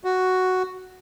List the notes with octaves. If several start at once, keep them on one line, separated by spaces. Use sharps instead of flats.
F#4